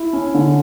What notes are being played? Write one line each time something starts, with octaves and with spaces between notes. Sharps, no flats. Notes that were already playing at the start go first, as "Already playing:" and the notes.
Already playing: E4
C#4
D3